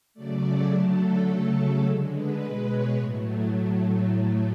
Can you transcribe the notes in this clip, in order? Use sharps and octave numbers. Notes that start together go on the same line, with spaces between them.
C#3 F#3 A3 D5
D3 F#3 A3 A4
C#3 F#3 A3 A4
D3 G#3
B4
B2 G#3
C#5
A2 F#3 A3